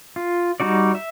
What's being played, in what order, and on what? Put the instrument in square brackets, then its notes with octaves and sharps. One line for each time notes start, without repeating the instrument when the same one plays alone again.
[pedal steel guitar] F4
G3 D#4 F#4 D5
E5